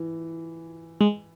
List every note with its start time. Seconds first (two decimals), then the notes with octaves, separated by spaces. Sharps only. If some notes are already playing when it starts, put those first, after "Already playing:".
Already playing: E3
1.01 G#3